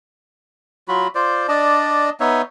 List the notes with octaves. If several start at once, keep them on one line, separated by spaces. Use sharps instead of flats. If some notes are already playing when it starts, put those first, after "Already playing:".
F#3 F4 F#4 B5
F4 C5 D5
D4 D5 D#5 A5
B3 D#4 C#5 E5